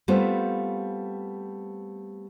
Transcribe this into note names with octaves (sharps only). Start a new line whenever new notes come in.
G3 A3 B3 C4 F4 C5